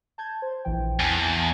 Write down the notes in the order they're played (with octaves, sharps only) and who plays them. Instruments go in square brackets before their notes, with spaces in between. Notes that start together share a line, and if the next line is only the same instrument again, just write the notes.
[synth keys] A5 G6 G#6
C5
A#1 E3 G5
[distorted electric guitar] E2 [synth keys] G#5 A5